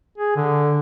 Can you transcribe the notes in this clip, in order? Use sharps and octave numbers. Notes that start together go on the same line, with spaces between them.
G#4
D3